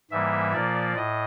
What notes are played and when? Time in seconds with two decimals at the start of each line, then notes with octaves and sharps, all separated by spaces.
0.11 G#2 E3 G3 A#3 E5
0.53 A#2 F3 A#3 D5
0.96 A2 D#5